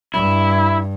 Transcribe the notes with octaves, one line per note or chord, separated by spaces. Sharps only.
G2 E4